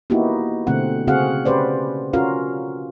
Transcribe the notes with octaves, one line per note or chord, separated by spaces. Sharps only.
A#3 B3 D#4 E4 F#4 G4
B2 D3 A3 C4 F#5
C#3 C4 F#4 G#4 F5 F#5
C#4 G4 B4 C5 D5
C#4 F4 F#4 A#4 F5